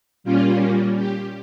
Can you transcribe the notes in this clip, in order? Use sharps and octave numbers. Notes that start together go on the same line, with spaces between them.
A#2 G3 A#3 C#4 F4
G4